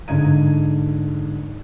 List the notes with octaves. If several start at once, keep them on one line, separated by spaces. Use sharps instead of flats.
G#2 D3 G#6 D#7